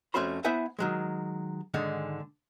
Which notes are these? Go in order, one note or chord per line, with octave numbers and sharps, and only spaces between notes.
F2 A3 C#4 F#4 C5 B5
B3 E4 C5 E5 F#5 G#5
D#3 F#3 G#3
G#2 D3 D#3 G#3 F#5